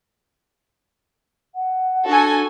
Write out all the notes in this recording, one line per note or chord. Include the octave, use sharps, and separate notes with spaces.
F#5
D4 F#4 A4 G#5